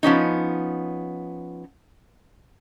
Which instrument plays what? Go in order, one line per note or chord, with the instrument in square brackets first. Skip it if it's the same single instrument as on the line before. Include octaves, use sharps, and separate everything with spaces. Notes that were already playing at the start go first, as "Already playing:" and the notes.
[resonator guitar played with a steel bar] F3 B3 C#4 D#4